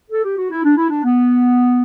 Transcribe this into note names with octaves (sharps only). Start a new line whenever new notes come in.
A4
G4
F#4
E4
D4
E4
D4
B3